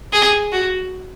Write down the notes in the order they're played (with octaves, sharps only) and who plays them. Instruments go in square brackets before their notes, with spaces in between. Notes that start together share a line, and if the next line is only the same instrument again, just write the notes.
[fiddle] G#4
F#4